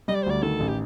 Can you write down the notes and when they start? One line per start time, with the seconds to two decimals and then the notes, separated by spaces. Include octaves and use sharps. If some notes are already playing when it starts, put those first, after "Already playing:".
0.08 G3 D#5
0.15 D5
0.23 C5
0.26 D2 D5
0.43 D#3 A4
0.60 A1
0.69 G4